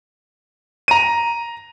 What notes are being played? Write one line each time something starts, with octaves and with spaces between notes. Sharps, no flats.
A#5 D#7